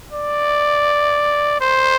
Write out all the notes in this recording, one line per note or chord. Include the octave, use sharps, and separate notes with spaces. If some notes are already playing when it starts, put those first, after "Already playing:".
D5
C5